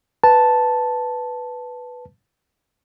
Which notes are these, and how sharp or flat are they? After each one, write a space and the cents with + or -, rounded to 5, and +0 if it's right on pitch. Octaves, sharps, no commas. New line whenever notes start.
B4 +0 A5 +0